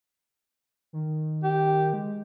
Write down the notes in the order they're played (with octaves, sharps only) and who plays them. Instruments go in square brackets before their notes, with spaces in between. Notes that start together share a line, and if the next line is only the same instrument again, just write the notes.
[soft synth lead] D#3
[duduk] G4
[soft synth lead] G#3